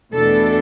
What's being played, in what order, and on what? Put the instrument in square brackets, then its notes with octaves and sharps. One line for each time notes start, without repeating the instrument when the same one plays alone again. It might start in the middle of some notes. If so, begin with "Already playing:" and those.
[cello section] E2 B2 A3 D4 A4